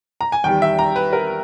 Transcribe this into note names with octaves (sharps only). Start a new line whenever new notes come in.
A#5
G#5
E2 D#3 G3 G5
E5
A#5
B4
A#4